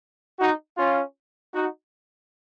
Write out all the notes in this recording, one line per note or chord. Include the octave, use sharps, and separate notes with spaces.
D#4 F#4
C#4 F4
D#4 F#4